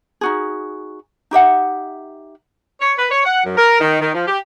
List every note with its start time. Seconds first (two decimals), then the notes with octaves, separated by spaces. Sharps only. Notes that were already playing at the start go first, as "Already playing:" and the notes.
0.21 D#4 F#4 G#4
1.31 D#4 G4 E5 F#5
2.81 C#5
2.98 B4
3.11 C#5
3.25 F#5
3.45 F#2
3.57 A#4
3.81 D#3
4.01 D#3
4.15 F3
4.27 G4